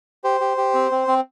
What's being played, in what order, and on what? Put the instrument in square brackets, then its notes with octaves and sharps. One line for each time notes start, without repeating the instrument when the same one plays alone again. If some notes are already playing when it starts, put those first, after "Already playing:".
[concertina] G4 C5
G4
G4
C4
C4
C4